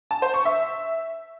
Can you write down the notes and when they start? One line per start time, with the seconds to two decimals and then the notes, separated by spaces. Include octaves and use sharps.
0.11 A5
0.22 C5
0.34 C#6
0.45 E5